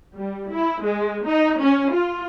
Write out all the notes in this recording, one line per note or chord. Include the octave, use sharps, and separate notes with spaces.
G3
E4
G#3
D#4
C#4
F4